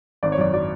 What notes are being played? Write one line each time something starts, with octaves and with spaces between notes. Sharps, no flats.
G#1 D5
C#5
F#2 D5
F#3 D5